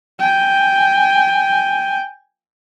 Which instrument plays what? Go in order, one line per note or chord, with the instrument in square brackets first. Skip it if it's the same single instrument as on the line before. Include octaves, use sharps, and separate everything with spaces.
[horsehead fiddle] G5 G#5